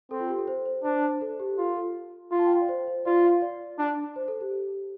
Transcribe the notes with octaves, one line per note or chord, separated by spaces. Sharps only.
C4 A4
F4
G4
A4
C5
C5
D4 C5
C5
A4
G4
F4 A4
A4
F4
A5
G5
F5
D5
C5
C5
F4 D5
F5
D5
D4
C5
A4
G4